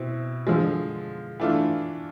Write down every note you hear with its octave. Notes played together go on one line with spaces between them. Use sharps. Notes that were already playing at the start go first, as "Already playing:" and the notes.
Already playing: B2 C4 E4
D3 F3 G#3
E3 A3 D4 F4